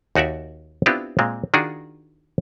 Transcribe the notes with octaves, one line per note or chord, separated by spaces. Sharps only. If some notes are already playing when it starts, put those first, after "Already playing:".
D#2 D#4 F#4 D5 E5
B3 C4 D4 E4 F4 G4
A#2 G#3 C4
D#3 D4 F4 F#4 G#4